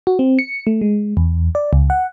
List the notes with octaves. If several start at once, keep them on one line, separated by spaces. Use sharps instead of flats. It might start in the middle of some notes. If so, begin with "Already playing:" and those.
F#4
C4
C#7
A3
G#3
E2
D5
C#2
F#5